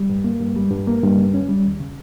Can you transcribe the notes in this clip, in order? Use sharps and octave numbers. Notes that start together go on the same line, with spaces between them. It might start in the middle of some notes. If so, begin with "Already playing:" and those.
Already playing: G3
G2
A#3
G2
G3
G2
A#3
G2
C#3
C#4
G3
D#2
C#3